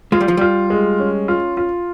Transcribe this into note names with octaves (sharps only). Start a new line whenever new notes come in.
G#3 F4
G3
F3
G3 F4
G#3
C#4
F4
F4